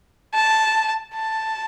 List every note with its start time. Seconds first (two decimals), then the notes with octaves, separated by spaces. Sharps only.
0.34 A5
1.15 A5